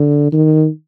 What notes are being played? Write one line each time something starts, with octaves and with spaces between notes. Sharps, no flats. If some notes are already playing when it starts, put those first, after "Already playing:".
Already playing: D3
D#3